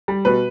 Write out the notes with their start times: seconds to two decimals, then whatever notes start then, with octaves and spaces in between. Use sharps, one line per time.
0.08 G3
0.25 B2 B4